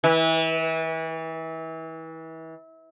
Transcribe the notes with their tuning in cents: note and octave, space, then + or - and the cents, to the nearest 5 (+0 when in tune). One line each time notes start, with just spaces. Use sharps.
E3 -30